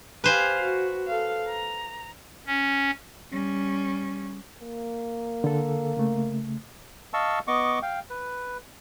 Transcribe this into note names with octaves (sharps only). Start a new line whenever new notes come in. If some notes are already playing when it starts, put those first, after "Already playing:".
G4 B4 C5 F5 G#5
F#4
A4 F5
A#5
C#4
G3 C#4
A#3
D3 A4
C#3 A3
D#5 F5 A5 C#6 E6
B3 D#5 C#6 D6
F5 G5
B4